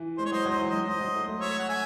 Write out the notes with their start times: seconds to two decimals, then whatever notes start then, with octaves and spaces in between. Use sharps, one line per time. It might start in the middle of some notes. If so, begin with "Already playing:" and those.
Already playing: E3
0.18 G#3 C5
0.26 C#5
0.32 F#3 C5 D#5
0.45 F#3
0.50 C5 D#5
0.60 E3
0.68 F#3 C5 D#5
0.86 E3 C5 D#5
1.01 F#3
1.14 A3
1.28 A3
1.41 C#5 E5
1.59 F#5
1.68 E5 G#5